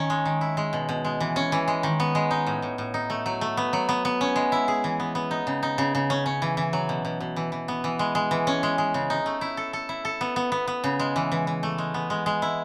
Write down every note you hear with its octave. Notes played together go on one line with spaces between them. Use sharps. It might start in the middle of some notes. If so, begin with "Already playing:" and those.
Already playing: D#3 C#4
G#3
D#3
E4
G#3
B2
B2
G#3
E3
C#4
E3
G#3
D#3
B3
G#3
D#4
A2
A2
A2
D#4
A3
F#3
A3
B3
F#3
B3
B3
C#4
G#3
E4
G#4
E3
B3
B3
D#4
C#3
D#4
C#3
C#3
C#4
C#4
E3
E3
F#3
B2
B2
B2
E3
E3
B3
E3
G#3
G#3
E3
C#4
G#3
G#3
C#3
D#4
A3
E4
A4
A4
E4
A4
B3
B3
B3
B3
C#3
G#3
E3
E3
E3
A3
G#3
B3
G#3
G#3
E4